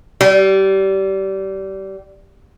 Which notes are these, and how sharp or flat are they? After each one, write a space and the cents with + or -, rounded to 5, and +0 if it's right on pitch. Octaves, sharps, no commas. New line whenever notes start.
G3 -25